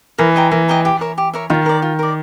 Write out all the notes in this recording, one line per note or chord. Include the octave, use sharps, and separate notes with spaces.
E3 A#4
D#5 G5 A#5
E3 A#4
D#5 G5 A#5
G4
A#4 C#5 E5
G4
A#4 C#5 E5
D#3 F4
A#4 D5
F4
A#4 D5